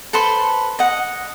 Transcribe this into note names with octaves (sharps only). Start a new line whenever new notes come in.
A4 B4 C5 C6
D#5 F#5